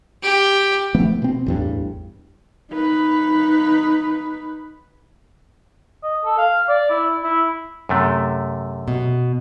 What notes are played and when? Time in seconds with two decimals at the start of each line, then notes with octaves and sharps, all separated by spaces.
0.23 G4
0.95 F3 A3 B3
1.22 B2 C4
1.46 A1 E2 G2
2.71 D#4 B4
6.03 D#5
6.25 A4
6.38 F5
6.69 D5
6.90 E4
7.24 E4
7.89 F#2 C3 A3
8.88 B2